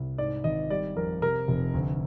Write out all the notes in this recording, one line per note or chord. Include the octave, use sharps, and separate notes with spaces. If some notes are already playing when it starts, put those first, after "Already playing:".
Already playing: C2
G#2 D5
G#1 D#5
G3 D5
F2 A#4
C3 A#4
F1
D2